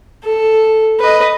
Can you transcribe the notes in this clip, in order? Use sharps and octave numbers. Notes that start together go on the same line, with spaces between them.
A4
B4 D#5